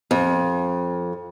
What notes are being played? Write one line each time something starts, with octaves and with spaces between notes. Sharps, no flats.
F2